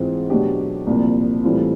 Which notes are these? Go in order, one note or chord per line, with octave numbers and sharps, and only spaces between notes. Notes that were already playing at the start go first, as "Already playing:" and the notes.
Already playing: G#2 E3 G#3 C4 F4
B2 F#3 B3 D4 G4
C2 A#2 F3 A#3
A2 E3 G3 C4 F4